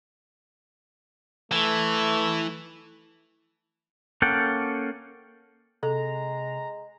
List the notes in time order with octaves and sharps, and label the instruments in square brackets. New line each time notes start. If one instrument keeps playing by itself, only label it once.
[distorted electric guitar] E3 [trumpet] A3
[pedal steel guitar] A#3 C#4 A4 F#5 G5
[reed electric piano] C3 [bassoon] G#3 [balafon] A4 [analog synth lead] A#5